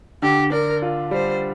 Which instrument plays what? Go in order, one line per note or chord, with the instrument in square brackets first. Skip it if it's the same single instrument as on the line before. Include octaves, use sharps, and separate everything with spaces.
[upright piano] D3 [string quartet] G4
[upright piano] D4 [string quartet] A#4
[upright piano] F4
[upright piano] G3 [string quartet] C5